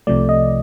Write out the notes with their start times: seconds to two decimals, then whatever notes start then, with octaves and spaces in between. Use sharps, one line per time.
0.07 C2 C3 F3 A3 D5
0.29 D#5